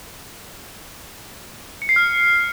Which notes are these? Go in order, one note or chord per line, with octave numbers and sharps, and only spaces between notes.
C#7
C7
F6